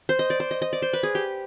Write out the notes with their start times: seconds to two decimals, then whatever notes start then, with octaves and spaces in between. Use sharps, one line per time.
0.09 C5
0.19 D#5
0.30 D5
0.40 C5
0.51 D#5
0.62 D#5
0.73 D5
0.82 C5
0.93 B4
1.03 G#4
1.15 G4